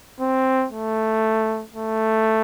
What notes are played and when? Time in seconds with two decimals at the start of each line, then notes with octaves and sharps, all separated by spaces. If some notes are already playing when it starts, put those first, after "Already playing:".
0.20 C4
0.72 A3
1.75 A3